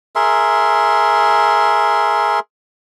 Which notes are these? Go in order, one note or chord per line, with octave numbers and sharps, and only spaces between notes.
G#4 A#4 E5 C6